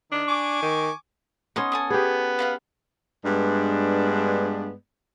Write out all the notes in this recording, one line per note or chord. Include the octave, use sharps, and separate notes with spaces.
D#3 D4
G#5 C#6 D6
D#3
B3 C#4 D#4 C6 D#6
A4 G#5 D#6
B3 G4 G#4
B4 F5 F#5
G2 G#3 B3 D4